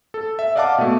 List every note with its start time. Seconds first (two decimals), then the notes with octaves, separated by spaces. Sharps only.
0.14 A4
0.39 E5
0.56 D5 D#5 F5 F#5 A5 D6
0.78 B2 A3